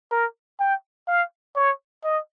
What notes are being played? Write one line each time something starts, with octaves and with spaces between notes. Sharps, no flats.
A#4
G5
F5
C#5
D#5